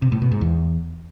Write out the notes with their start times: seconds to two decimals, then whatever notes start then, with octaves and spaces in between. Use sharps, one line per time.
0.02 C3
0.12 A2
0.22 B2
0.31 G#2
0.41 E2